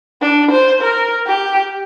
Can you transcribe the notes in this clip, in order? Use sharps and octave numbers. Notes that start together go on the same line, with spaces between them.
D4
C5
A#4
G4